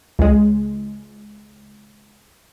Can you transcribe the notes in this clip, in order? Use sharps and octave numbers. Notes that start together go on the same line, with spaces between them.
C#2 G#3